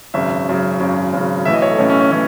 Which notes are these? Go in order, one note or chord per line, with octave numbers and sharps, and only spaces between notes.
G#1 F#2 C#3 E5
G#1 F#2 C#3
G#1 F#2 C#3
G#1 F#2 C#3
B1 A2 E3 E5
D#5
C#5
A4
B1 A2 E3 C#4
C#4
C#4
A2 E3 C#4